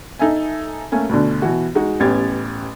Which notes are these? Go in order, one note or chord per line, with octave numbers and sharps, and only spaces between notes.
D#4 A4 E5 G#5
A3 A#3 C#4 G#5
D2 B2 D3
B2 E3 F#4
G#3 D#4 F#4
A1 B3 C#4 G4 G#6 A6